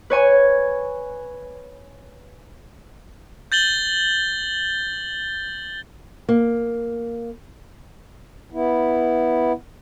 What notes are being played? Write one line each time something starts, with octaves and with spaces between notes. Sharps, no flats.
B4 C#5 G#5 C#6
G6 A6 F#7 G7
A#3
B3 E4